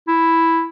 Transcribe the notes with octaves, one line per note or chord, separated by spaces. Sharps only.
E4